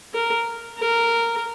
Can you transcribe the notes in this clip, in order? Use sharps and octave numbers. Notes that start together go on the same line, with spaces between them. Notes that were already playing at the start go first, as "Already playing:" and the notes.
A#4
A#4